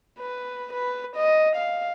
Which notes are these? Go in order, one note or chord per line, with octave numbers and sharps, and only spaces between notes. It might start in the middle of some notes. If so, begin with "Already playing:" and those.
B4
B4
D#5
F5